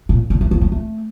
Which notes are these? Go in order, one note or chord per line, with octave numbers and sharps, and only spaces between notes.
A#2
D3
E3
F3
G3
A3